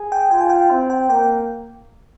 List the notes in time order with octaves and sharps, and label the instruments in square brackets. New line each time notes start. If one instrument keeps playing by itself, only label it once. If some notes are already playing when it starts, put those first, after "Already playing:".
Already playing: [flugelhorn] G#4
[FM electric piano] G5
[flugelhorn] F4 [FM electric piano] G5
[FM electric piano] G#5
G5
[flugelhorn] C4
[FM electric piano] G5
[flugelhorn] A#3 [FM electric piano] G5